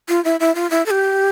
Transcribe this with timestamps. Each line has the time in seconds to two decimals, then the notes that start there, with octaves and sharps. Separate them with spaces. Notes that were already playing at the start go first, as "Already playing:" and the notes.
0.09 F4
0.25 E4
0.40 E4
0.55 F4
0.71 E4
0.86 A4
0.91 G4